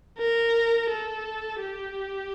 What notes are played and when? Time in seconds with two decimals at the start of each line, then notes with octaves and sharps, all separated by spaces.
0.19 A#4
0.91 A4
1.62 G4